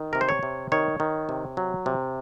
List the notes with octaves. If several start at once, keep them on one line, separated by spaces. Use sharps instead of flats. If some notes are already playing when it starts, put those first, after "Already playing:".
Already playing: D#3
C3 A#4
C5
C#5
C3
D#3 C#5
D#3
C3
F#3
C3